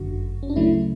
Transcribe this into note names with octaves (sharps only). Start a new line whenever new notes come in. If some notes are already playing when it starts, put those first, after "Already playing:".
Already playing: G1 F#2 D3 F#4
C#4
D4
D2 C#3 F#3 A3 E4